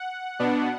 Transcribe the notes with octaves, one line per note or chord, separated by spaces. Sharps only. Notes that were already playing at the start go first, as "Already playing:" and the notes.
Already playing: F#5
B2 B3 D4